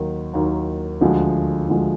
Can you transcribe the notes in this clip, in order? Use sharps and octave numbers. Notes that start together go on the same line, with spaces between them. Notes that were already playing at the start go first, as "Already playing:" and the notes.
Already playing: D#2 D#3 F#3
D#2 D#3 F#3
D2 D3 F3 G#3
D2 D3 F3 G#3